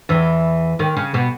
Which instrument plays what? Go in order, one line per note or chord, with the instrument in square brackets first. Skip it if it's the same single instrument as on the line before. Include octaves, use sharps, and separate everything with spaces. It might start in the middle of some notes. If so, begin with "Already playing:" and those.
[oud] E2 E3
D#2 D#3
C#3
B2